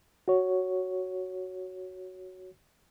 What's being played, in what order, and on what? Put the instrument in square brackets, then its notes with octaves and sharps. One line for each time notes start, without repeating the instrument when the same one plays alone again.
[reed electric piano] F#4 C#5